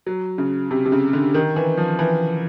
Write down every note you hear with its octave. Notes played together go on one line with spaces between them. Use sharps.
F#3
C#3
C3
C3
C#3
D3
D#3
E3
F3
E3